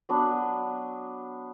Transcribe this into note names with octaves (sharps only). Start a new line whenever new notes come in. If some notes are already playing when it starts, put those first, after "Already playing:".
F#3 B3 D4